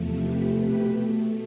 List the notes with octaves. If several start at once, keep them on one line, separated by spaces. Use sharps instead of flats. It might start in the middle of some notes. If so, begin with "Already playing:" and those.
Already playing: E2 C3 F3 A3
G4 B4
B2 A3 G4 B4